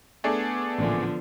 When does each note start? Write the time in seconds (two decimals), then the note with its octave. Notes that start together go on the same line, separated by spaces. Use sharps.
0.24 A3 B3 D4 G#4
0.78 A1 A#2 D3 F3